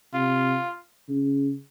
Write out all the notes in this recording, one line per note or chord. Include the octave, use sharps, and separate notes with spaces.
C3 F4
C#3